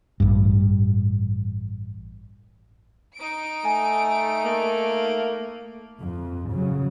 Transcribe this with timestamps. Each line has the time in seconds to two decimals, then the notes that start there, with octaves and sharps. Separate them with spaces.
0.20 A1 G2
3.17 D#4 D7
3.65 A3 G#5
4.45 A#3
6.00 F2
6.51 C#3 F#3